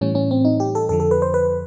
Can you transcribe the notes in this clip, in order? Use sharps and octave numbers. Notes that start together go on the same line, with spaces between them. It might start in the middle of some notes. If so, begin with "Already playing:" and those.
A2 E3 G3 C#4
C#4
C4
D#4
G4
A4
F2 D3 F3 A4
A4
B4
C5
B4